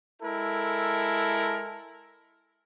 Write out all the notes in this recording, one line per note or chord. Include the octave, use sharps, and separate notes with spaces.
G#3 E4 A4 A#4